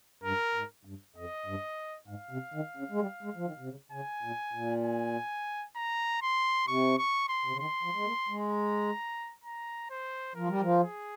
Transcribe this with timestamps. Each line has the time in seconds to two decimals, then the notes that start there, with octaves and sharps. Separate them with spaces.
0.24 G2 A#4
0.54 G#2
0.85 G2
1.16 F2 D#5
1.46 G2
2.08 G#2 F5
2.31 C3
2.54 D#3
2.77 C#3
2.91 G#3
3.00 G3
3.23 G#3
3.36 F3
3.46 D#3
3.59 C3
3.69 C#3
3.92 C#3 G#5
4.23 A#2
4.53 A#2
4.84 G#5
5.76 A#5
6.22 C6
6.67 C3 C#6
6.98 C#6
7.29 C6
7.45 C3
7.52 C#3
7.59 D#3 C6
7.83 F3
7.95 G#3
8.06 A#3
8.29 G#3
8.51 A#5
9.44 A#5
9.90 C5
10.35 F3 A#4
10.48 G3
10.61 F3
10.81 G#4